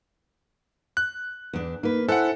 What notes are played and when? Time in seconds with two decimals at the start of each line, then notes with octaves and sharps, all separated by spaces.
0.97 F#6
1.53 E2 D4
1.83 A#3 D#4 B4
2.09 E4 A4 C5 F#5 G#5 F#6